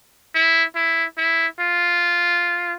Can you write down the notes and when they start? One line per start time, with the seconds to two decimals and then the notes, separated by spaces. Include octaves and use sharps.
0.35 E4
0.76 E4
1.18 E4
1.60 F4